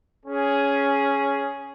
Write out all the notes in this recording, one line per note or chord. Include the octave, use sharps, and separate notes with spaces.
C#4 G#4